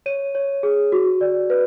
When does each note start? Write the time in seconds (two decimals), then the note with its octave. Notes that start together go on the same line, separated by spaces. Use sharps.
0.06 C#5 D#7
0.35 C#5
0.63 G#4
0.92 F#4
1.21 D5
1.50 B4